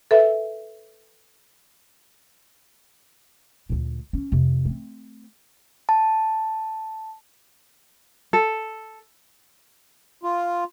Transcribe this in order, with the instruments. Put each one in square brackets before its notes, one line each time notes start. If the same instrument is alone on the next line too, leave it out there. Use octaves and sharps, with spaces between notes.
[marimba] A4 B4 E5
[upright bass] D2 A#2
C#4
F2 C3
A3 C4
[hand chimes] A5
[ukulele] A4
[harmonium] F4